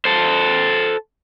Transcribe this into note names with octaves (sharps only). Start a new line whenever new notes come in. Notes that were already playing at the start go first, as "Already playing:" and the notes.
A4 C5